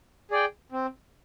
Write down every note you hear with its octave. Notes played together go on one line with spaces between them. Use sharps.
G#4 D5 G5
C4